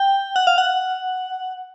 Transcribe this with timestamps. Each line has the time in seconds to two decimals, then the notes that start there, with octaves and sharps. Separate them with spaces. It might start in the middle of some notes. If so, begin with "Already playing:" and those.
Already playing: G5
0.36 F#5
0.47 F5
0.58 F#5